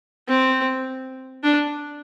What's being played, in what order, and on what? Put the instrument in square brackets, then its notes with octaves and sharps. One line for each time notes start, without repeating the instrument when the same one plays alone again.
[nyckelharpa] C4
D4